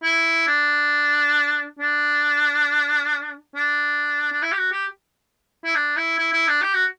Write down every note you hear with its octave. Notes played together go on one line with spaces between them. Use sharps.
E4
D4
D4
D4
D4
E4
G4
F#4
G4
E4
D4
E4
E4
E4
D4
G4
F#4